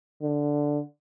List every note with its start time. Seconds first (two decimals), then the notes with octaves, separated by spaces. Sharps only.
0.22 D3